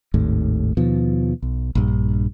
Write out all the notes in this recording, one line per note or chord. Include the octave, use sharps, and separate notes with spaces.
G#1 D#2 A2
D#2 B2 F3
B1
A#1 G2